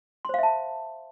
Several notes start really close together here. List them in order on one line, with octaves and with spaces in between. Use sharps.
C6 C5 F5 E5 A5